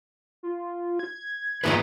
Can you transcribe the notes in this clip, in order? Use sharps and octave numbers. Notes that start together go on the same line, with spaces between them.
F4
G#6
G#2 E3 A#3 B3 F4 B4